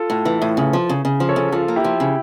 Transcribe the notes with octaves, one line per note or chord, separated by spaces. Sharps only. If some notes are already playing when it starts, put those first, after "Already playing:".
Already playing: F4 A4
A2
E3
A2
C#3
F3
C#3
C#3
F3
A4 C#5
C#3
F3 F4 A4
A#3
E4 G4
F3
C#3